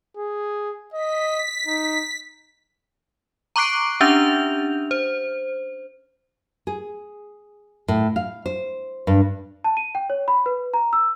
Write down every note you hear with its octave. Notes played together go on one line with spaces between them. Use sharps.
G#4
D#5 B6
D#4
A#5 C#6 D6 F#6 C7 D7
C#4 D4 G4 E5 G6 F7
C5
G#4
A2
F5
C5
G2
A5
D#7
G5
C#5
B5
B4
A#5
E6